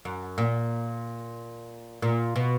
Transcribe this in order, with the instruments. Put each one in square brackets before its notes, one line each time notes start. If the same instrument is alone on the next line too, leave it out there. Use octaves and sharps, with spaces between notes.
[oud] F#2
A#2
A#2
B2